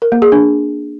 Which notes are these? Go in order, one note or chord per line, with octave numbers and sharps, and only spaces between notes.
A#4
A#3
G#4
D4